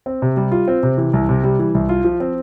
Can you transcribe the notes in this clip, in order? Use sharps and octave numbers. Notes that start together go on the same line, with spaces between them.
C4
C3
G3
F4
C4
C3
E3
C2
C3
G3
E3
C2
F4
F3
C4